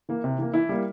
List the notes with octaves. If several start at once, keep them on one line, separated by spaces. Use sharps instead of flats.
E3 A#3
C3
E3 A#3
E3 E4
G3 A#3